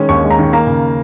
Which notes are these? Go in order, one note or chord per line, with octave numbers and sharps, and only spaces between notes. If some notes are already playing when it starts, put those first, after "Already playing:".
Already playing: D#3 G#3 C#4
D#2 C#6
G#3
A#5
D#3
A#3 A#5
C#3